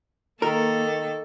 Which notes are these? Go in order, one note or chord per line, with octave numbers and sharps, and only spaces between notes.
D#3 A#3 A4 A#4